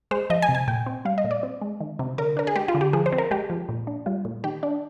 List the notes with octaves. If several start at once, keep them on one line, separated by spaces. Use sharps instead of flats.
G#3 C5
F3 D#5
G#5
C3
G#5
A#2 G5
C4
G3 F5
D#5
A#2
D5
C4
G#3
D#3
C3
D3 A#4
D4 A#4
G#4
G#3 G4
F4
D3
G4
F3 G#4
C5
C4
A#4
G#3 G4
F3
A#2
D4
G3 F4
A#2
D#3 G4
D4